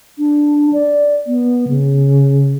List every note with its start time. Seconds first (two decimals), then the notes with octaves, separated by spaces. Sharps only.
0.19 D4
0.73 D5
1.27 B3
1.68 C#3